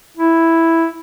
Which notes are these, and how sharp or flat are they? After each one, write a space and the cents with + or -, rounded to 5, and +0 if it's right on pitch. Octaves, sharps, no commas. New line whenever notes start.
E4 +0